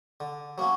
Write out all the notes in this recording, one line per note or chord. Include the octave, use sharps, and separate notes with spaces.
D3
F#3 A#3 C#4